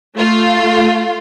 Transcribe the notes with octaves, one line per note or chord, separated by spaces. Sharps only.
A3 F4